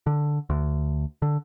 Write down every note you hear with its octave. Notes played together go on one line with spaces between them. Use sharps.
D3
D2
D3